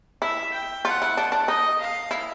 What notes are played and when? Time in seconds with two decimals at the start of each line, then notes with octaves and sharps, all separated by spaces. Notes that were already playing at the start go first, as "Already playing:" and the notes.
0.22 E4 E5
0.53 G5
0.85 F4 F#5
1.02 E4
1.17 D4
1.32 D4
1.48 D#4 D#5
1.80 F5
2.11 E4